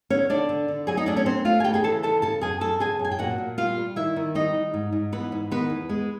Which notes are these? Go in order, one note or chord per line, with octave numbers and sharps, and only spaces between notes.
D3 C#4 C#5
D3 D4 D5
D3
D3
F#3 G#4 G#5
D#4 D#5
A3 D4 D5
C#4 C#5
C4 D4 C5
A3 F4 F5
G#5
C#3 G4 G5
G#4 G#5
E3 A4 A5
C#3 A4 A5
C#3 A4 A5
F#2 G#4 G#5
F#2 A4 A5
C#3 G#4 G#5
F#2
G#5
G5
A#2 F#4 F#5
A#2
G3 F4 F5
G3
D#3 E4 E5
D#3
G3 D#4 D#5
D#3
G#2
G#2
E3 B3 B4
G#2
D#3 B3 B4
E2
G#3